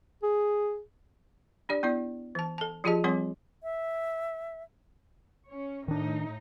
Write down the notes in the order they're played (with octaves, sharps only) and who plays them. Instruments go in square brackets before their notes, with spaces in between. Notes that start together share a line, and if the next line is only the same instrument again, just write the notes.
[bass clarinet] G#4
[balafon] D4 G4 D5
B3 E4 D5
E3 A5
A4 A5
F3 F4 G4 G#4 D#5 A5
F3 G3 C4 C#5 F#5 C6
[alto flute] E5
[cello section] C#4 C#5
[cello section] A2 D#4 [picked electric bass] D#3 D4